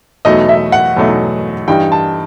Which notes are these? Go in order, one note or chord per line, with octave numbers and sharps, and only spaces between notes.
E2 B2 F#3 A3 D#4 D#5
E5
F#5
E2 B2 F#3 A3 D#4
G2 E3 G3 D#4 G5
A5